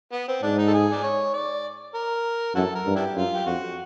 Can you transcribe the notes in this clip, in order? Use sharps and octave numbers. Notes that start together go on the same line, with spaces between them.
B3
C4
G#2 D4
D#4
A4
G#4
D5
C#5
D5
A#4
F#2 E4 F#4 A4
A#4
G2
D4 E4 G4
F#2 F4
G4
F2 F#4